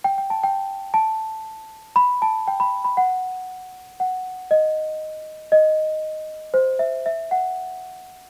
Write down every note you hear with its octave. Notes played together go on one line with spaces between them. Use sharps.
G5
G5
A5
G5
A5
B5
A5
G5
B5
B5
F#5
F#5
D#5
D#5
C5
E5
E5
F#5